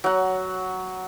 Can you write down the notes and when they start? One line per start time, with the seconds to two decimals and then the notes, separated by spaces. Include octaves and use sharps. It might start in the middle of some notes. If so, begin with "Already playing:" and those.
0.04 F#3 F#5